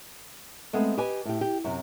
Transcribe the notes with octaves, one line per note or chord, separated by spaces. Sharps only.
G#3 A3 B3 C4
G4 B4 D#5 G#5
A2 G4
G4
F#2 C3